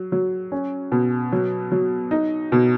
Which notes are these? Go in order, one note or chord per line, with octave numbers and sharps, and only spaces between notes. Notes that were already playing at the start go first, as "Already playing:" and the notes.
Already playing: F#3
F#3
C#4
B2
F#3
F#3
D#4
B2